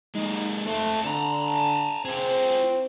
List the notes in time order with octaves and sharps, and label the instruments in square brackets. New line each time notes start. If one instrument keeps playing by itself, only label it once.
[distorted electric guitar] G#3 A#3 [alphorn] D#4
[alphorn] A3 [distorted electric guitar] C4 A4
[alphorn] D3 [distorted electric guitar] A5 A#5
[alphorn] C4 [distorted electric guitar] F4 G#4